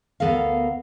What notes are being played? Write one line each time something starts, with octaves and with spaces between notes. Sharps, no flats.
D2 B3 A4 A#4 F5